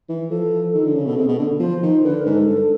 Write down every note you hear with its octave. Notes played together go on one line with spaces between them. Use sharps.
E3
F3 A4
D#3
D3
C#3
B2 A4
C3 G#4
B2
A4
D3
F3 C5
D#3
D3 B4
A#4
G#2
A4
G2